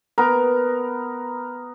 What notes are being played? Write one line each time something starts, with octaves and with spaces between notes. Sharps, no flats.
B3 A#4